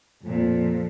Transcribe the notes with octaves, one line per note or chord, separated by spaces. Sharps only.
F2 A#2